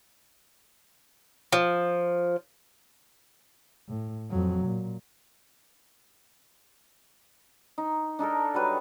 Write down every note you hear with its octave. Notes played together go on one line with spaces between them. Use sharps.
F3
A2
F2 F#3
A#2
D#4
D4 D#4 A4 A#4
F#3 G3 B4